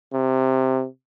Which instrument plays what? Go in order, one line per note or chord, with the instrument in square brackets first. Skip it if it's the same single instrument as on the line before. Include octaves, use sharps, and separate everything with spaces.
[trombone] C3